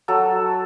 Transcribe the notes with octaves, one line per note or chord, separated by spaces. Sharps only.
F#3 A4